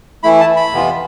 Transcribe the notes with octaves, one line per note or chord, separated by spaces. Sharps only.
E3 A3 E4 B5
A5
B5
F2 C3 E3 B3 F4